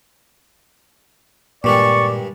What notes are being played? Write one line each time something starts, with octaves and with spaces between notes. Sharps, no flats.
G2 A#2 D#3 G#3 D5 C#6